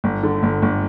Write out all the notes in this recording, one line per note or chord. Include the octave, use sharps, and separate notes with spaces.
G1
D3
G1
G1